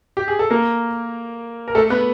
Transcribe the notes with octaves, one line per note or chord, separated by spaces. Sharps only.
G4
G#4
A4
A#3 A#4
A#4
A3 A4
B3 B4